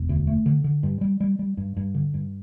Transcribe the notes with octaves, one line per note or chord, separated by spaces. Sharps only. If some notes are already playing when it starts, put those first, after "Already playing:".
Already playing: E1
D2
A3
D3
D3
G2
G3
G3
G3
G2
G2
D3
G2